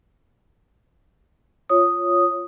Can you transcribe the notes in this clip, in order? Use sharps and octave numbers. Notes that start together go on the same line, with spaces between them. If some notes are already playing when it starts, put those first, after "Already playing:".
F4 C#5 D#6